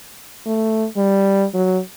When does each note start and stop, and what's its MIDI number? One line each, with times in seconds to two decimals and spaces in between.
0.46 0.86 57
0.97 1.45 55
1.54 1.79 54